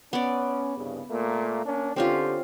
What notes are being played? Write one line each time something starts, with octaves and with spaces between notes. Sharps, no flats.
B3 C#4 D5
C2 G2 C#3
A#2 A3 A#3
A#3 C#4 D4
D3 C4 C#4 F4 G4